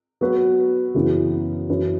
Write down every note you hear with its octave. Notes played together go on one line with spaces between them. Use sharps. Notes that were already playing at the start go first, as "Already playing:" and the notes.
F#3 B3 F#4 B4
F#2 C#3 E3 B3 E4
F#2 E3 C#4 E4 B4